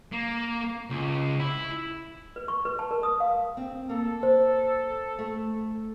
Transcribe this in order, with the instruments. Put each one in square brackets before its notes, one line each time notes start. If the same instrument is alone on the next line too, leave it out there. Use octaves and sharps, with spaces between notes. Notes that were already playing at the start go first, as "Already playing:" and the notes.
[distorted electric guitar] A#3
C#2
E4
[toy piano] B4
C#6
B4
A5
A#4
D#6
F5
[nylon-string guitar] C4
[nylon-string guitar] A#3 [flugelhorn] A4
[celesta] C5
[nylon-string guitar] A3